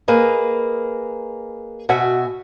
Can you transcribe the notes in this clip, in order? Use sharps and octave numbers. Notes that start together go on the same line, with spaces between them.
A#3 G#4 B4 D#5
B2 F#4 E5 G#5